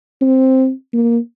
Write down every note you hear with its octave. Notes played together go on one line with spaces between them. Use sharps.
C4
A#3